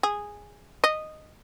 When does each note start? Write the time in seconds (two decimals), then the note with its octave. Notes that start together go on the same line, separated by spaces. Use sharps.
0.03 G#4
0.84 D#5